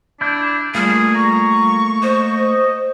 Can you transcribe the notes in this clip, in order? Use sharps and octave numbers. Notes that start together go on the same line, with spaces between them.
D4 E4 G6
G3 A3 A#3 F4 G#4
A#5 C#6
C5 D#5